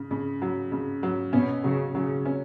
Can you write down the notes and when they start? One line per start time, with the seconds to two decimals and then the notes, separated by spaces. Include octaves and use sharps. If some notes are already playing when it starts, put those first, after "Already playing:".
Already playing: C#3
0.11 C#3
0.42 F#3
0.72 C#3
1.03 F#3
1.33 B2 C#4
1.64 C#3 F#3
1.95 C#3 F#3
2.25 C#4